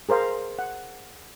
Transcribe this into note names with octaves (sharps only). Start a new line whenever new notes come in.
G#4 A#4 C5 F5
F#5